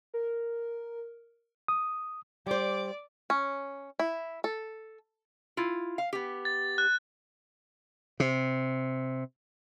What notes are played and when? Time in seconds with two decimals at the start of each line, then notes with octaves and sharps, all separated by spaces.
0.14 A#4
1.68 D#6
2.47 G3 C5 D5 D6
3.30 C#4
3.99 E4
4.44 A4
5.57 E4 F4
5.98 F5
6.13 B3 G4
6.45 A6
6.78 F#6
8.20 C3